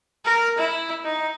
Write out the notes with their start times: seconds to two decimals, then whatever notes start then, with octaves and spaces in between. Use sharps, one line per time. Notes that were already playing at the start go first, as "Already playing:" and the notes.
0.25 A#4
0.58 E4
1.04 D#4